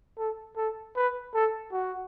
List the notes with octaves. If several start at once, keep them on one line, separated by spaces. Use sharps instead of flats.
A4
A4
B4
A4
F#4